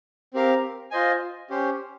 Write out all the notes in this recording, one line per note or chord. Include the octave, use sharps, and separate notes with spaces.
C4 G4 A#4 F5
F4 C5 D#5 G#5
C#4 G4 C5